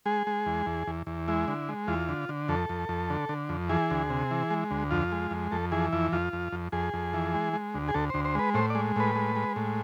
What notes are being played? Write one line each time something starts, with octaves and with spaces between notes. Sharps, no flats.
G#3 G#4
G#3
E2
E2
E2
E2
G#3 E4
D3
G#3
E2 F4
D3
D3
F2 A4
F2
F2
D3
D3
F2
E3 G#4
D2
C3
E3
G#3
D2
F2 F4
G#3
F2
F2 A4
E3 G#4
F2 E4
F2 F4
F2
F2
F2 G#4
F2
E3
G#3
G#3
D2
G#4
D2 A4
D2 C5
C5
G#3 B4
A2 C5
G#3 D5
A2 B4
G#3
G#3
A2